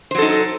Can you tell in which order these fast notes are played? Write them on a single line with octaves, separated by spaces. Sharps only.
C5 F#3 A4 D#4